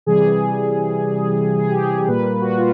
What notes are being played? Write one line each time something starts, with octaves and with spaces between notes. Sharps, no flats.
C3 E3 G3 G#4
G#4
G4
G#4
A#2 G3 A#3 B4
F#4
F4